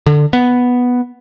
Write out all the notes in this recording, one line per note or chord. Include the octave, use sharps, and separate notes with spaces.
D3
B3